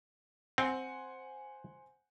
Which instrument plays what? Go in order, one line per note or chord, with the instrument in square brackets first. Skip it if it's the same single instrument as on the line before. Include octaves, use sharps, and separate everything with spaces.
[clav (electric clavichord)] C4 [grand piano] C5 F#5 G#5